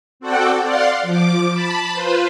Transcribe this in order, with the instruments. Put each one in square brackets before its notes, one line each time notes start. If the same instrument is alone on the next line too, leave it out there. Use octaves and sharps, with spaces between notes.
[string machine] C4 F#4 A4 D5 F#5 G5
D5 F5 F#5 C6
F3 D6
A5 B5
F4 B4 C5